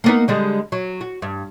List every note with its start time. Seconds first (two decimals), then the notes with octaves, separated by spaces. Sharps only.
0.04 A#3 B3 D#4
0.28 D3 G3 G#3
0.72 F#3
1.01 F#4
1.22 G2